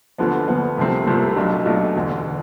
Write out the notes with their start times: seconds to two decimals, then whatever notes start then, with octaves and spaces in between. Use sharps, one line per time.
0.18 D2 D3 F3 B3
0.48 D2 D3 F3 B3
0.77 C2 C3 F3 A3 C4
1.06 C2 C3 F3 A3 C4
1.36 B1 B2 A3 D4
1.65 B1 B2 A3 D4
1.95 E1 D2 D3
2.25 D3